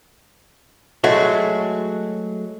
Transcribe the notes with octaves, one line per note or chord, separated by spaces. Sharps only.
F#3 G#3 A3 F#4